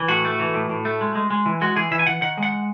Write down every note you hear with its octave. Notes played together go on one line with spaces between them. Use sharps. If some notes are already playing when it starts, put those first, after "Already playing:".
Already playing: E3
A2 F#4
A3
E3
A2
A2
A3
G#3
G#3
G#3
E3
G#3 F#4
E3 G#4
E3 E5
G#5
E3 F#5
D#3 F#5
G#3
F#5